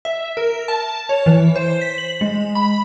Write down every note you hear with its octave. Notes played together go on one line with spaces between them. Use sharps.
E5
A#4
A5
C#5
E3
C5
B6
F#7
G#3
B5